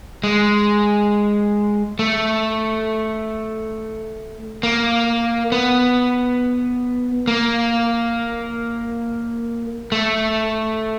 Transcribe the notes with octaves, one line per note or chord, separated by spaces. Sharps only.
G#3
A3
A#3
B3
A#3
A3